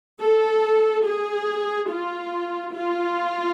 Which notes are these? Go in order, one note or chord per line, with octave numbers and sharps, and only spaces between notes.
A4
G#4
F4
F4